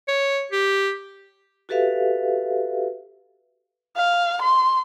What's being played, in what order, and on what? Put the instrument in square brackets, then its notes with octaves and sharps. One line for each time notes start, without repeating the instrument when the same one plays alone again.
[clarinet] C#5
G4
[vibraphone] F#4 G4 A4 B4 E5 F5
[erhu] F5
C6